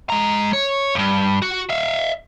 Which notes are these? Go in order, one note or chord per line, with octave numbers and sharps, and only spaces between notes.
G#3 A#5
C#5
E2 G2
F#4
E5 F5